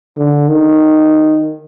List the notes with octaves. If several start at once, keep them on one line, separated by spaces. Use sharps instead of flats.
D3
D#3